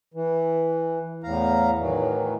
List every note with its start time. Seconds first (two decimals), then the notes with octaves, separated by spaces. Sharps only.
0.14 E3
1.24 E2 A2 F5 A#5
1.78 A2 D#3 E3 F#3